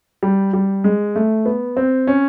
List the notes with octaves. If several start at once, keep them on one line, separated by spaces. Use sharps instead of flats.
G3
G3
G#3
A3
B3
C4
C#4